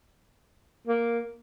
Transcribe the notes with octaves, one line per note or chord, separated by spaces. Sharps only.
A#3